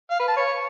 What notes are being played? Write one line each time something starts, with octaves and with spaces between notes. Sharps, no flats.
F5
B4
A5
C#5